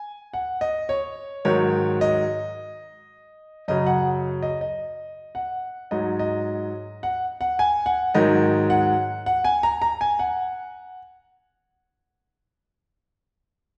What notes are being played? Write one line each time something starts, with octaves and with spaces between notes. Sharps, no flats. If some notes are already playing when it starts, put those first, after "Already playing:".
Already playing: G#5
F#5
D#5
C#5
G#2 D#3 F#3 C#5
D#5
F#2 C#3 F#3 D#5
F#5
D#5
D#5
F#5
G#2 F#3 D#5
D#5
F#5
F#5
G#5
F#5
G#2 D#3 F#3 D#5
F#5
F#5
G#5
A#5
A#5
G#5
F#5